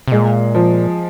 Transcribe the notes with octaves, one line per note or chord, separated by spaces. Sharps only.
C3
A#2 G#3
F3